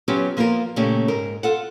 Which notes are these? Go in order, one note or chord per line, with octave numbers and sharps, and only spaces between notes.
F#3 B3 C#4 F4 G4
F3 A#3 B3 F4 A#4
A#2 C#3 A3 A#3 C#4 G4
G#2 A#4
F4 A4 F#5